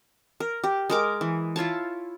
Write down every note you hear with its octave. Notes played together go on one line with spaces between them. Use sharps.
A#4
G4
G#3 A#4 D6
E3
E4 F4 C#5 A5